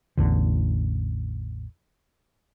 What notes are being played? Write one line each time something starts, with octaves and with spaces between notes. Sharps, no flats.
A1 E2 D3